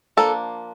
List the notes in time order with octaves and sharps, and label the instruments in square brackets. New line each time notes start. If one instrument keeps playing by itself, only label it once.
[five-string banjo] F3 A#3 D4 A4